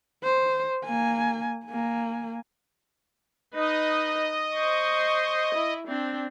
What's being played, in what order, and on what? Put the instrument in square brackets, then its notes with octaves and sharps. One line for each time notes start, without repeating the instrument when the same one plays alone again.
[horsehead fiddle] C5
A#3 G#5
A#3 G#5
[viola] D#4 B4 [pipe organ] D#5
[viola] C5 C#6
E4
C4 D4